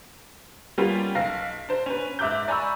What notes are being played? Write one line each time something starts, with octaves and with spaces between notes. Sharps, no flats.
G3 A#3 B3 C#4 F4 G4
B1 F5 A#6
D4 C5
C#4 B4
G#2 E5 D6 F#6 G6
D5 G#5 A#5 B5 C#6 E6